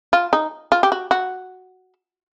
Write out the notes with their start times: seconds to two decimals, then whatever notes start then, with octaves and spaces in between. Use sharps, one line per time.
0.13 F4
0.33 D#4
0.72 F4
0.83 G4
0.92 F#4
1.11 F#4